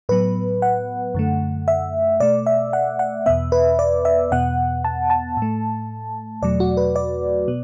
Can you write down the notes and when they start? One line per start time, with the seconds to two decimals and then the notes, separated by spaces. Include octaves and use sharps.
0.09 A2 F#3 B3 B4
0.62 F#5
1.14 F#2 D3 A3
1.68 E5
2.20 B2 A3 D5
2.46 E5
2.73 F#5
2.99 F#5
3.26 E2 B2 B3 E5
3.52 B4
3.79 D5
4.05 E5
4.31 E2 B2 B3 F#5
4.85 A5
5.10 A5
5.37 A2 A3
6.42 E2 B2 F#3 A3 D5
6.60 F#4
6.77 B4
6.96 D5
7.48 B2 B3